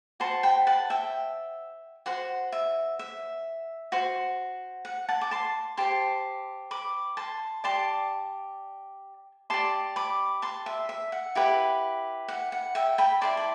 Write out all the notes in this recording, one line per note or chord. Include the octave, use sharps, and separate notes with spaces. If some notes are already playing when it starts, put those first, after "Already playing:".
F#4 C5 A5 C6
G5 B5
F#5 A5
E5 G5
F#4 C5 F#5
E5
E5
F#4 C5
F#5
F#5 A5
D6
A5 C6
G4 C5 A5 C6
B5 D6
A5 C6
G4 D5 A5 C6
G4 D5 A5 C6
B5 D6
A5 C6
E5
E5
F#5
E4 G4 B4
F#5
F#5
E5 G5
G5 B5
E4 B4 D5 A5 C6
B5